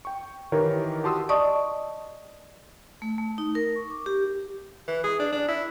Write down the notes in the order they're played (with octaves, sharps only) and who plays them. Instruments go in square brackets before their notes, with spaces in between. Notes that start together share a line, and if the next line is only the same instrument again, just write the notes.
[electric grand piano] G5 C#6
D#3 E3 D#4 G4 A#4 C#5
F#4 G4 A5 C6 D#6 E6
[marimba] D5 D#5 A5 C#6 D#6
[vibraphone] A3
A3
D#4
A#4
C#6
D6
G4
[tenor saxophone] E3
G#4
D4
D4
E4